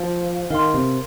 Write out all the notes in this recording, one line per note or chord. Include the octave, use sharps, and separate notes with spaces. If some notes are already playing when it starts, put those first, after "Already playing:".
Already playing: F3
D#3 A#4 F5 C6
C3